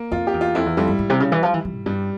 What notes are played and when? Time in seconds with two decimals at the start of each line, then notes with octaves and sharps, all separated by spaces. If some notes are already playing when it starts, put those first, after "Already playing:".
Already playing: A#3
0.11 F2 F4
0.27 G4
0.34 E2
0.41 F4
0.55 F2 E4
0.66 E2
0.77 F2 G3
0.87 G2
0.99 G#2
1.10 C3
1.20 C#3
1.32 E3
1.43 F3
1.54 E3
1.65 F3
1.75 G#2
1.86 G2 G3